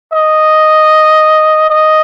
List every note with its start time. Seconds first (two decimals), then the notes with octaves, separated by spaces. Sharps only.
0.13 D#5
1.70 D#5